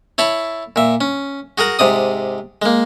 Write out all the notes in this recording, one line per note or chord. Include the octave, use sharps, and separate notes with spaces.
E4 C#5 A5 B5
A#2 E5
C#4
F#4 G#4 A#4 F#5
G#2 C3 D5 D#6
G#3 A#3